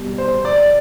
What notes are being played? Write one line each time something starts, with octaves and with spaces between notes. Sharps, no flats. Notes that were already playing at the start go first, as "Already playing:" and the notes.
Already playing: B2 G3
C5
D5